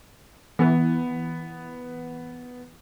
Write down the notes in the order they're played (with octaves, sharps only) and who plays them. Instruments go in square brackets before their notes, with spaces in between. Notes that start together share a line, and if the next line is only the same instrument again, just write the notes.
[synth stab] E3 [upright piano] B3